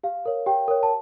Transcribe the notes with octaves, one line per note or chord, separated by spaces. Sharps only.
G4 F5
A#4 C#5
G4 G5
A#4 C#5
A5